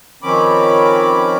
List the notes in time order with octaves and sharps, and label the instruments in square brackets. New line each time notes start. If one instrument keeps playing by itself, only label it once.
[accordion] D#3 F3 C4 C#4 B5 D6